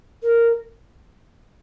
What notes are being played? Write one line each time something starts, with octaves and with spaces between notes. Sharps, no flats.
A#4